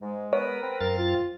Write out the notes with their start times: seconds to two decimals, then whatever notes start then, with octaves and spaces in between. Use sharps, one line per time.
0.02 G#2 G#3
0.33 B3 A#4 B4 C#5
0.62 C4
0.81 F#2 A#4 F5 A6
0.98 F4